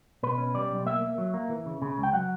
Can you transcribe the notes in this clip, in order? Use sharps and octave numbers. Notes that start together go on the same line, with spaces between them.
B2 B4
C#4
G3 D5
B1
A#3 E5
A#3
F#3
A#3
E3
C#3
C#3
C#2
G5
F#3 F#5